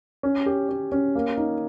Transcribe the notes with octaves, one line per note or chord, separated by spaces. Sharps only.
C#4
G4
C#4
C#4
A#3
D#4